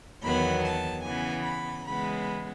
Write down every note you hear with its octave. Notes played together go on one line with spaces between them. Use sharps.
E2 D#3 F#3 B3 B5
A5
C#3 E3 B3 G#5
B5
C#3 E3 G#3 B3 B5